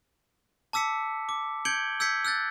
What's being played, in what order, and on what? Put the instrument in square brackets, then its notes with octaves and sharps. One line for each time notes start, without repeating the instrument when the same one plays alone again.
[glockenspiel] A5 D6 E6 B6 C#7
D6
G6 G#6 C#7 D7 F#7 G7
E6 G6 G#6 B6 C#7
E6 F#6 G6 A6